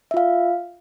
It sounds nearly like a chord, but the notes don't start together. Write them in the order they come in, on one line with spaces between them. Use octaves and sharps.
E5 F4 F5